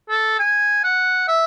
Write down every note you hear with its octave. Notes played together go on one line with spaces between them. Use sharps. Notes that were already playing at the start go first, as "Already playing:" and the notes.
A4
G#5
F#5
E5